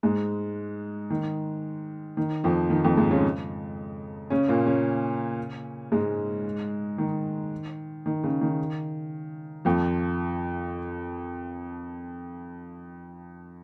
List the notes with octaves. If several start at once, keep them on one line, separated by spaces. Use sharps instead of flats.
G#2 G#3
D#3
D#3
F2 F3
D#3
F2 F3
G#2 G#3
C#3 C#4
C#3 C#4
A#2 A#3
C#3 C#4
G#2 G#3
D#3
D#3
C#3
D#3
F2 F3